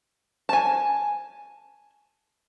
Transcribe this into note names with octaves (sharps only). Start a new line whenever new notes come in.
G#5 A5